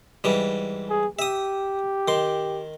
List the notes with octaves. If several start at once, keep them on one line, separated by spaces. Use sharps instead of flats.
G#2 E3 G3
G#4
G4 E5 D#6
D#3 C6